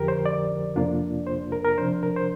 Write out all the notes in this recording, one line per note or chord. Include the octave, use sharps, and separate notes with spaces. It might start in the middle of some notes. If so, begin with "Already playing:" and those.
Already playing: F2 D3 F3 G4 A#4
C5
D5
F2 C3 A#3 D4 F4
C5
A#4
A#4
C3 F3 D4 C5
A#4
C5